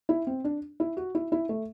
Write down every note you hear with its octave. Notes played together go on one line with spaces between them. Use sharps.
E4
C4
D4
E4
F#4
E4
E4
A3